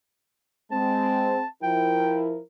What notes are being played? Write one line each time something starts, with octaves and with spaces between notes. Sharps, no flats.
G#3 C4 A5
F3 E4 A#4 G5